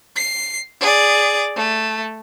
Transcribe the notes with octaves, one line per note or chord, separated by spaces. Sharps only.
C7
G#4 D5
A3